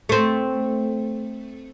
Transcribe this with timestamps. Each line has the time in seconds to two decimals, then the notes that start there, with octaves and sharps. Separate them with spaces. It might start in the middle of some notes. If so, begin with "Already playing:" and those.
0.09 A3 C4